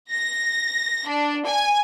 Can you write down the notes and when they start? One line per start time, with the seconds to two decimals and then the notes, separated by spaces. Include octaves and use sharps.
0.12 A#6
1.07 D4
1.46 G#5